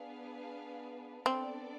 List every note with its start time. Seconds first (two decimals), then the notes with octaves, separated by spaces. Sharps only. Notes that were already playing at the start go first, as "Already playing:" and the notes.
Already playing: B3 D4 G#4 B4 F5
1.26 B3 C4 D4 A4 D5